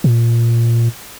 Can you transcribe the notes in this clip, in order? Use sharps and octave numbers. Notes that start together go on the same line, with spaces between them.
A#2